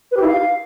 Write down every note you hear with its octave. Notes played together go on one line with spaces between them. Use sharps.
B4
G4
E4
F5